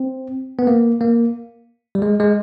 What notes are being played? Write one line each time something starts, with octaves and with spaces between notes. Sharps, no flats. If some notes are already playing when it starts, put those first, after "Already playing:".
Already playing: C4
B3
A#3
A#3
G3
G#3
G#3